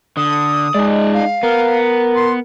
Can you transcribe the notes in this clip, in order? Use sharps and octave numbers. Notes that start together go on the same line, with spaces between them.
D3 D#6
G#3 D#4 D5
F5
B3 A#4
C6